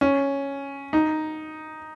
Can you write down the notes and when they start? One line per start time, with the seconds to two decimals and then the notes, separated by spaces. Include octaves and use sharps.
0.01 C#4
0.93 D#4